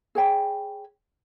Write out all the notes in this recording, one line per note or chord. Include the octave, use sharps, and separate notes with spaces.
G#4 C#5 G5 B5